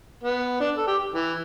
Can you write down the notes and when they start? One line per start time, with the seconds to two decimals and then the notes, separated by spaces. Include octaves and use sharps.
0.23 B3
0.60 D4
0.77 A4
0.87 G4
1.14 E3